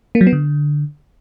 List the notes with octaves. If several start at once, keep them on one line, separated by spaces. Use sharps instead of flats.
A#3
F#3
B3
D3